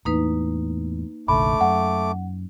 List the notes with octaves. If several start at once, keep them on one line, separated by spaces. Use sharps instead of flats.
E2 A2 A#3 D#4 B4
F1 A#1 D3 A3 B5 D6
F#2 F#5